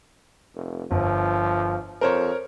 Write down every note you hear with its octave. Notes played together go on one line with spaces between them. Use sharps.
F1
G1 F3
F2 A#4 C5 C#5